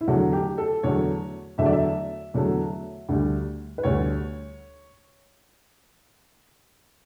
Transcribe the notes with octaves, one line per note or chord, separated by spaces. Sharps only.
E4
E2 D3 F#3 A3 F#4
G4
A4
E2 D3 F#3 A3 C#5
E2 D3 F#3 A3 E5
D5
E5
E2 D3 F#3 A3
D2 D3 G3
B4
D2 D3 G3 C#5